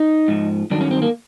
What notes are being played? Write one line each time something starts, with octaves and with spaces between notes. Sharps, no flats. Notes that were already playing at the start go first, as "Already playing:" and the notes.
Already playing: D#4
G#2 F3
G2 D#3 F#3 D4
C#4
C4
A#3